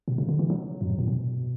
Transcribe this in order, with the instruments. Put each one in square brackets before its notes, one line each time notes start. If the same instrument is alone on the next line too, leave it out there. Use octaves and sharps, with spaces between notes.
[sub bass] B2
C#3
D3
E3
F#3
F#2
G2
A#2
B2